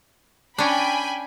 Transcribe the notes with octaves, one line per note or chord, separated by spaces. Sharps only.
C#4 D4 G5 G#5 B5